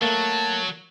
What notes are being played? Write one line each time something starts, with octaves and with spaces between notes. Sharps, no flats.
F#3 A3 A#3 A5